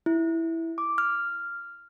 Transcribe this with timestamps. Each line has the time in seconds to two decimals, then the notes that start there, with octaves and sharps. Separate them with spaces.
0.06 E4
0.78 D6
0.98 F6